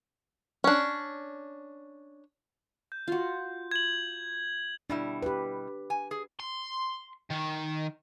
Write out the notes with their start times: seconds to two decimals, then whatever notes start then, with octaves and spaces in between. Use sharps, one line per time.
0.64 C#4 D4
2.92 G6
3.08 F4 F#4
3.71 G#6 F#7
4.90 B2 G3 D4 E4
5.23 G4 B4
5.90 G#5
6.11 G#4
6.40 C6
7.30 D#3